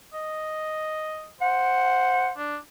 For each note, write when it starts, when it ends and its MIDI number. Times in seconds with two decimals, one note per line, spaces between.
0.14 1.29 75
1.41 2.32 72
1.41 2.30 78
2.37 2.57 62